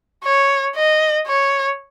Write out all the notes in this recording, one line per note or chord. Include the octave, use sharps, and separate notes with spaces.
C#5
D#5
C#5